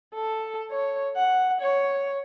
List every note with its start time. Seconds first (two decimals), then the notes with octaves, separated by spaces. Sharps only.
0.14 A4
0.71 C#5
1.16 F#5
1.61 C#5